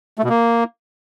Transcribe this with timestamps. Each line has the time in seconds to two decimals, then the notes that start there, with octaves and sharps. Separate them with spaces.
0.18 A3
0.24 B2
0.29 A#3